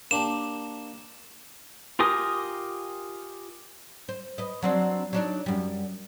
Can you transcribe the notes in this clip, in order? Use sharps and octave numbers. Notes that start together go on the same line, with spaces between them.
A#3 D4 G4 E7
F4 G4 A#4 G#5 D#6
C5
B4 D#5
F#3 C4 D4
F#3 D4 D#4
F#2 G3